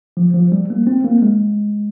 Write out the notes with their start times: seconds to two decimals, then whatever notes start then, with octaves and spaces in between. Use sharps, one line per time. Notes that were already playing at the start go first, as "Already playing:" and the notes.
0.17 F3
0.34 F3
0.52 G3
0.70 A#3
0.87 C4
1.05 A#3
1.22 G#3